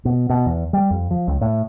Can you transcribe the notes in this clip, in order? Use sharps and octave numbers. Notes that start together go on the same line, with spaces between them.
B2
B2
E2
G3
F2
F3
C#2
A2